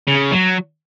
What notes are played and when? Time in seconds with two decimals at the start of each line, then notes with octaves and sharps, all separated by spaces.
0.08 C#3
0.32 F#3